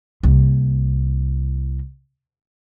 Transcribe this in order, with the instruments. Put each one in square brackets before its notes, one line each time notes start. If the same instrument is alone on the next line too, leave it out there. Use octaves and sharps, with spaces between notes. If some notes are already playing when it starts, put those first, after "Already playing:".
[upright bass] C2 A#3